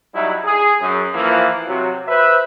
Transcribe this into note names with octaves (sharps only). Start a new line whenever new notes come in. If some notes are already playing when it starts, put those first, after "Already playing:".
F#3 G3 D#4 E4
G#4
F#2
E3 F3 A#3 E4 F4
C3 F#3 F#4
B4 C5 E5